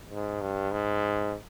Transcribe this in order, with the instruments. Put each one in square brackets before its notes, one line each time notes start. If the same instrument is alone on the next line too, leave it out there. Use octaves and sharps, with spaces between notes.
[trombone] G#2
G2
G#2